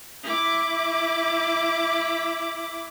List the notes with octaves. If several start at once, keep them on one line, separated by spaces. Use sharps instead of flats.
E4 D6